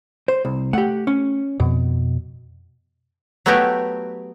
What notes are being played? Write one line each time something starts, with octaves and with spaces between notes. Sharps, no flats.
C5
C2
A3 G4 F#5
C#4
F2 B2
F#3 A3 B3 E4 F#4 G4